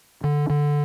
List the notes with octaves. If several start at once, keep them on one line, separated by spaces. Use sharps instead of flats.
D3
D3